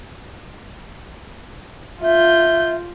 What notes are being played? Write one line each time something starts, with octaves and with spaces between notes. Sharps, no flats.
F4 E5 G6